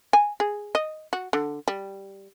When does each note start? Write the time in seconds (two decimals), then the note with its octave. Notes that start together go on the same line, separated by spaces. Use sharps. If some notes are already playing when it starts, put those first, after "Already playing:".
0.13 G#5
0.40 G#4
0.75 D#5
1.13 F#4
1.33 D3
1.68 G3